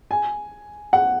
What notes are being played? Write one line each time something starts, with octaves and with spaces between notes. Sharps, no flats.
G#5
F#5